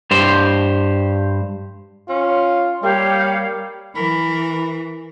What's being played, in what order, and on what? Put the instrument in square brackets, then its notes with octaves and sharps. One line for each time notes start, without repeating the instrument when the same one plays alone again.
[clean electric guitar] G2 G4 C5
[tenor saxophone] C#4 [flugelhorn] F4
[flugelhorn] G3 [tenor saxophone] A#3 [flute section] G4 C#5 F5
[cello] E3 [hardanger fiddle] A#4 [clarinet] B5